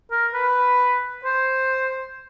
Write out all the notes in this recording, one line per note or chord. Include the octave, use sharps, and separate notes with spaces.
A#4
B4
C5